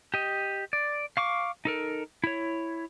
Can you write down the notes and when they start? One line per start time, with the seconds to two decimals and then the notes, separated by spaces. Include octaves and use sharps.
0.14 G4 D#5
0.73 D5
1.17 F5 C#6 D6
1.65 D#4 A4 A#4
2.24 E4 C#5